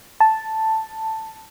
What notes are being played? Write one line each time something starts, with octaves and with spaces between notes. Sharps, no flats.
A5